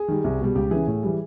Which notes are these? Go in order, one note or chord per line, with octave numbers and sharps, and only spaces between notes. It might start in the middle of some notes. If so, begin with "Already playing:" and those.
Already playing: G#4
D#3 G3
C2
B2 G3
C#2 G4
C#3 E3 G#4
A2
E3 G3